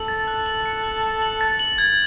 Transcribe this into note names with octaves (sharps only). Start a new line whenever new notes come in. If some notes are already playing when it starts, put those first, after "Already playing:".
Already playing: A4 F#7
A6
F#6
F#7
C#7
F#6
F#7
F#7
A6
F#7
G#6